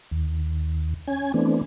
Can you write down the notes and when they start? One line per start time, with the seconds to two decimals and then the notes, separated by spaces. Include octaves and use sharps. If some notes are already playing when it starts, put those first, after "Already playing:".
0.11 D#2
1.07 C#4 G#5
1.34 E3 A3 B3 C4 D4